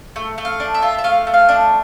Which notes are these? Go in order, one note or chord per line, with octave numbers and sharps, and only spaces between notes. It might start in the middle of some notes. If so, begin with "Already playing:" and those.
A3
A3
F5
D4
E5
F4
E5
A3 F5
A3
F5
D4